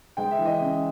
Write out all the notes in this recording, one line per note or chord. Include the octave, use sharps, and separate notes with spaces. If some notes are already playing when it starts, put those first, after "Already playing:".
G#3 G5
E5
E3
D#5
C#3